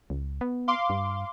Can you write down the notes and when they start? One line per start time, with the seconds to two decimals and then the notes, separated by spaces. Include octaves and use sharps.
0.10 C#2
0.41 B3
0.68 F5 C6 D6
0.90 G2